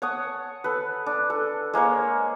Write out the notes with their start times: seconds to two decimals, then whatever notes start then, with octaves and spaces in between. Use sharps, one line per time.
0.02 C#5 F#5 A5 D#6
0.64 A4 B4
1.06 D4
1.30 A4
1.74 G#3 A#3 C5 C#5